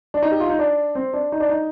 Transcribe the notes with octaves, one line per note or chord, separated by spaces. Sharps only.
D4
D#4
G4
F4
D#4
D4
C4
D4
D#4
D4
D#4